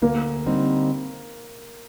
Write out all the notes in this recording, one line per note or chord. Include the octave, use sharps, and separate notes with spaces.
D2 A#3
D3 G3 C4 D#4